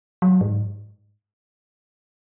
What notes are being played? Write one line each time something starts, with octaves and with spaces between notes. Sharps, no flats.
F#3
G#2